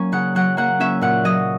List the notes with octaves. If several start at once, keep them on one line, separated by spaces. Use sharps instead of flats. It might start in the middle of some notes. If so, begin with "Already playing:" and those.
Already playing: F#3 A#3 C#4
C#3 F#5
F#3 F#5
A#3 F#5
C#4 E5
A#2 F#5
F#3 D#5